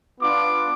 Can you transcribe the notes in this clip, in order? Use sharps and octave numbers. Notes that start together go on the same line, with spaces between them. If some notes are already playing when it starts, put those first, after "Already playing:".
B3 D4 F4 D6